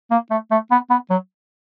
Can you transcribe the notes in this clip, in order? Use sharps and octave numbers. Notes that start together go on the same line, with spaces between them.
A#3
A3
A3
B3
B3
F#3